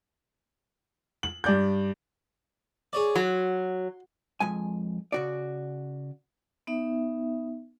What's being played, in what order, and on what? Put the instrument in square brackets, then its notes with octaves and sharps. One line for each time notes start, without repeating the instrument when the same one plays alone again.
[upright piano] F#7
G2 D5 G6
[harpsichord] G#4 C#5 D5
[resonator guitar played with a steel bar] F#3 [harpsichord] C6
[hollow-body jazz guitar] F2 G#3 G#5
C#3 F#4 D5
[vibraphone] B3 D#4 E5